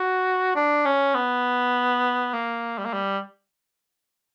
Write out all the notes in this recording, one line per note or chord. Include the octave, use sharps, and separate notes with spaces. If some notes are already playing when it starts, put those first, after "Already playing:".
Already playing: F#4
D4
C#4
B3
A#3
G3
A#3
G3